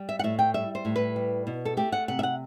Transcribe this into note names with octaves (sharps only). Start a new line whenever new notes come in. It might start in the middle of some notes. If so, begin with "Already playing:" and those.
Already playing: G3
E5
F#5
A2 E5
G5
G3 E5
C5
A2
B4
G3
B2
A4
A3 G4
F#5
C3 F#5
E5
F#5